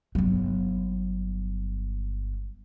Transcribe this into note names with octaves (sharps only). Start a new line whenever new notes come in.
G1 F#3